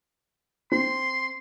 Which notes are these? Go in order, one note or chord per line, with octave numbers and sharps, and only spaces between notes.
C4 C6